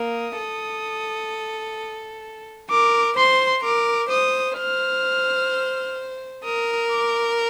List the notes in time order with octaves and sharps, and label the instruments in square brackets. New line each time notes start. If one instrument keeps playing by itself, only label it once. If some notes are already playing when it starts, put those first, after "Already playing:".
Already playing: [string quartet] A#3 [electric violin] D#6
[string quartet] A4
[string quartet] A#4 [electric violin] D6
[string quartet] C5 [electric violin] C6
[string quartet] A#4 [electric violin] D6
[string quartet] C5 [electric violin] D#6
[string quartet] C5 [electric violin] F6
[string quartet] A#4 [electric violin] D#6
[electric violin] D6